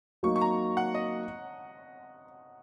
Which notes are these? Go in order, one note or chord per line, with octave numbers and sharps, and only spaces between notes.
F#3 A#3 D#4 C#6
C#6
A#5
F#5
D#5